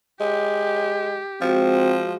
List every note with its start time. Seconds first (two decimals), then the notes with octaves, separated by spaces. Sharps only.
0.20 G#3 G4
1.41 F3 G#3 C4 F#4